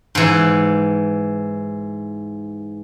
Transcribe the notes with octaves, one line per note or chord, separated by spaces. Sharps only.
G#2 E3